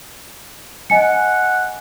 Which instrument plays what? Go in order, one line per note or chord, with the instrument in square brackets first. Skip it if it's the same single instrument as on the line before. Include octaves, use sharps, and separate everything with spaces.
[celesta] D#5 G#5 C#7 [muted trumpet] F#5